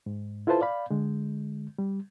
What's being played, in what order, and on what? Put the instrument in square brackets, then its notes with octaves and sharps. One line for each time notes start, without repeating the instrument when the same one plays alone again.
[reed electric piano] G#2
E4 F4 A4 B4 C5 A5
D5 F5 B5
D3 G#3
G3